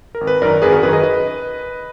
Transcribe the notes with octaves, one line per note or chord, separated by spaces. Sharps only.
A#4
G#1
B4
F#2 D#3 A#4 D5
G#1 G#4 B4
F#4 A#4
F#2 D#3 G#4 B4
B4 D#5
B4 D#5